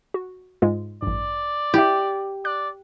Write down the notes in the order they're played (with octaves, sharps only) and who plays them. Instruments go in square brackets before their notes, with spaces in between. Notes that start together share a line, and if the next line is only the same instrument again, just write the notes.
[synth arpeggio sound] F#4
G#2 G#3 F4
[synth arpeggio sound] A1 G2 [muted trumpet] D5
[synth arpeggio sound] E4 E5 [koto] G4
[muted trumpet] D5 [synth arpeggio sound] F#6